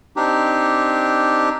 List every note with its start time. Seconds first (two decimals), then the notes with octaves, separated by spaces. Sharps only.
0.16 C4 D4 D#4 G4